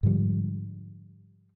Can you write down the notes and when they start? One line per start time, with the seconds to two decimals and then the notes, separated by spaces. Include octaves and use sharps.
0.03 G#2 D3 F3 G3